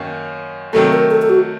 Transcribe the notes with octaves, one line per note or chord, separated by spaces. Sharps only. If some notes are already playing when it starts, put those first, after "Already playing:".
Already playing: F#2 D#3 A#3 C#4
C3 D#3 F#3 A3 A4
A#4
A4
A4
F#4